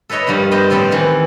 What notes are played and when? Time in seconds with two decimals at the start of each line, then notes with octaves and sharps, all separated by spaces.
0.09 A4 B4 C#5 D#5 E5
0.27 G2 F3 G3 A#3
0.51 B3 G4 C5 D#5
0.70 A2 F3 C4 A4 D5 F5
0.91 D#3 E3